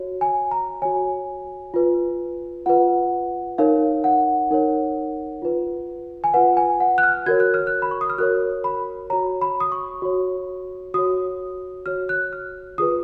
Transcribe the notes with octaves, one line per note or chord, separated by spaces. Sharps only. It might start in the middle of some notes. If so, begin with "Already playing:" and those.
Already playing: F#4 C#5
G#5
A#5
F#4 C#5 G#5
F4 B4
F4 B4 F#5
D#4 A#4 C#5 F5
F#5
D#4 A#4 C#5
F4 B4
G#5
F4 B4 F#5
G#5
F#5
F#6
F6
F#4 A#4 C#5 G#6
F#6
F6
F#6
B5
C#6
D#6
F6
F#4 A#4 C#5 F#6
B5
F#4 C#5 A#5
B5
D#6
C#6
F#4 C#5
F#4 C#5 D#6
F#4 C#5 F6
F#6
F6
F4 G#4 B4 D#6